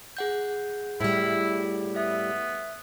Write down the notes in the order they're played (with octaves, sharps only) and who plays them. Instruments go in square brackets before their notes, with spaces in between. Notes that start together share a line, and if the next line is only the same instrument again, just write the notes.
[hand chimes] G#4 F#5 G6
[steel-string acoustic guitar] A2 G3 [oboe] E4
[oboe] B3 [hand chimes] E5